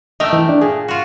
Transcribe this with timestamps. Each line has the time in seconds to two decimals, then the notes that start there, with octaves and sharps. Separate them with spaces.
0.20 A3 A#4 D#5 G5 E6
0.33 E3
0.49 D4
0.61 A#2 G#4
0.88 F4 F#4